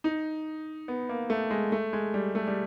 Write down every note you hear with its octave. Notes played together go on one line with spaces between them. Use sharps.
D#4
B3
A#3
A3
G#3
A3
G#3
G3
A3
G3